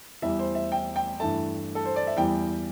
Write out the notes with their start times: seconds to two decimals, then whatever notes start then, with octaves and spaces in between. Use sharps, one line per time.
0.22 E2 E3 G3 E5
0.39 C5
0.55 E5
0.72 G5
0.96 G5
1.20 G2 E3 A3 A5
1.75 A4
1.85 C5
1.96 D5
2.07 E5
2.17 E2 E3 G3 G5